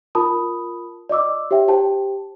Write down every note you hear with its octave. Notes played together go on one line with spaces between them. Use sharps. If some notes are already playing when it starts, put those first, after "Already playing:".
F4 A#4 A5 B5 D#6
D5 D#5 D6 E6
G4 C#5 E5 G5
G4 C5 G5 A5